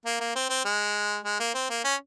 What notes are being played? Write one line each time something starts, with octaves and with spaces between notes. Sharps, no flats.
A#3
A#3
C4
C4
G#3
G#3
A#3
C4
A#3
C#4